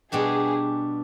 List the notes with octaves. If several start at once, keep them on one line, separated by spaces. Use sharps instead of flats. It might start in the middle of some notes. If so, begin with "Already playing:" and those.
B2 G3 D4 G4 G#4